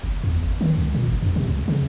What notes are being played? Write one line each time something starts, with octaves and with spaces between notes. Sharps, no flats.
F#1
E2
G1
D#3
C#2
A#2
G1
F2
C3
C#2
C#3